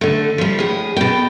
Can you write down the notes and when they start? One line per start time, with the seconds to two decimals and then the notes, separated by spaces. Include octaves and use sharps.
0.01 D3 A3
0.38 F3 G3
0.59 A2 G#4
0.96 B2 G5